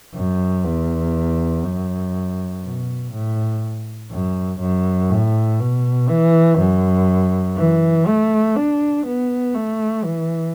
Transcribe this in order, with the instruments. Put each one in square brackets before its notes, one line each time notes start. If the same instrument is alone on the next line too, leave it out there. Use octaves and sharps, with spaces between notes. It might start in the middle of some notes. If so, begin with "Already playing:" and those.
[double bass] F#2
E2
F#2
B2
A2
F#2
F#2
A2
B2
E3
F#2
E3
A3
D4
B3
A3
E3